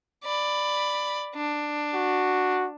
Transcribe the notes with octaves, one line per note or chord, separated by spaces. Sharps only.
D5 B5
D4
F#4